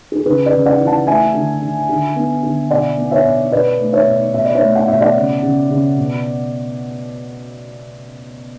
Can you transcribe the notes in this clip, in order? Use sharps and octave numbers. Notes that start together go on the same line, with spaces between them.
G#4
A4
C#3 G#4 B4
B4 D5
C#3
D5 F#5
E3
F#5 A5
A3 E5 G#5
D3
D3
D3
B3
D3
B2 D5 F#5
B3
C#5 E5
B2
B2 B4 D5
A3
C#5 E5
B2
B2 E5
D5
C#5 E5
A3
F#5
B2 E5
D5 F#5
C#3
C#3
C#3
B2